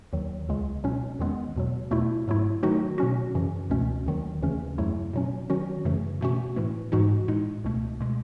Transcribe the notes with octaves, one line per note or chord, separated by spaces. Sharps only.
D#2 D#3 F#3
C#2 C#3 G#3
B2 F#3 C#4
E2 D#3 G#3 B3
E2 B2 F#3
E2 B2 A3 E4
G#2 F#3 A3 E4
D#3 F#3 A3 D#4 F#4
B2 F#3 C#4 F#4
F#2 C#3 E3
C#2 B2 A3 C#4
D#2 D#3 F#3
D#2 C#3 E3 A3 C#4
F#2 C#3 F#3 A3 E4
B2 F#3 C#4
D#3 F#3 C#4 F#4
F#2 C#3 E3 A3
B2 A3 C#4 F#4
A2 E3 A3
G#2 E3 G#3 D#4 F#4
A2 G#3 D#4
C#2 B2 A3
B2 G#3